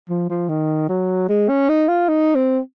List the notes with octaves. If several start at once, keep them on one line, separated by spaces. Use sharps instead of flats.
F3
F3
D#3
F#3
G#3
C#4
D#4
F4
D#4
C4